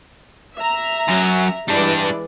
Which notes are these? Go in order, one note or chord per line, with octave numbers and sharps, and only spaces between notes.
E5 A#5
F#2 F#3
E3 G3 G#3 D4 D5